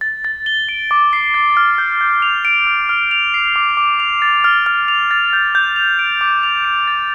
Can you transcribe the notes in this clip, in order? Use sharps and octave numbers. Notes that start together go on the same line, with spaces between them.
A6
A6
G7
D7
D6
C7
A6
F6
G6
G6
F7
D7
F6
F6
F7
C7
D6
D6
F7
A6
F6
F6
F7
A6
G6
G6
F7
D7
D6
F7
D7
A6